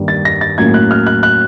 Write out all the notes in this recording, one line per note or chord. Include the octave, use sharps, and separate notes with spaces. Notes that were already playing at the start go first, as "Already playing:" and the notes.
Already playing: G2 D#3 G3 A#3
A6
A#6
A6
A2 F#3 A#3 C#4 G#6
F#6
F6
F#6
F#6